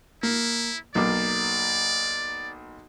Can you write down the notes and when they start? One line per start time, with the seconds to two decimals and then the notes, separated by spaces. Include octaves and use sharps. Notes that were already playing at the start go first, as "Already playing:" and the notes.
0.23 A#3 E4
0.95 B1 A#3 D5 D6